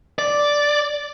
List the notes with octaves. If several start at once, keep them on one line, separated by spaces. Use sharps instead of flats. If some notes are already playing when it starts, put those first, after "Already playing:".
D5